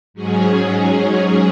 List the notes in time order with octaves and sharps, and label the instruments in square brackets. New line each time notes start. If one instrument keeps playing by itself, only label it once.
[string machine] G#2 F#3 C#4 G#4